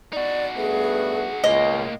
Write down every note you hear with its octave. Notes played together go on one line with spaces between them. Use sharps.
D#4 F#4 D5
G2 A3 B3 G#4
C#2 A2 A#3 D#5